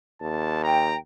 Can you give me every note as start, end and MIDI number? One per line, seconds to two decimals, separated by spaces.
0.21 0.95 39
0.21 0.63 81
0.63 0.93 79
0.63 0.96 82